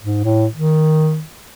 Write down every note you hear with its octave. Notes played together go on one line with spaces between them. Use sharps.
G#2
A2
D#3